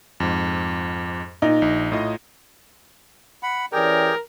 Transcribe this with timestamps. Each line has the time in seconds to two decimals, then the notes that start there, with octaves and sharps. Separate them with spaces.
0.20 F2 G#2
1.42 A#2 D#4
1.62 A#1
1.92 A2 F4 D#5
3.43 F#5 B5
3.73 E3 C#4 G4 G#4 A#4 D5 G5